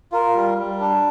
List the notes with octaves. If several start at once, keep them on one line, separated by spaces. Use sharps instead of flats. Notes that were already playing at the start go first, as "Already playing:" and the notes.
F4 A#4
G3
G3
D4